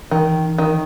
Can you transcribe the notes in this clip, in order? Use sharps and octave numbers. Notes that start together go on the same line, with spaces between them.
D#3 E3
D#3